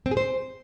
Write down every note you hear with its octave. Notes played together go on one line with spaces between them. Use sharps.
C4
G#4
C5